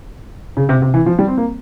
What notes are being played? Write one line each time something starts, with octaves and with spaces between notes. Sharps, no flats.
C#3
C3
C3
E3
F3
G3
C4
A#3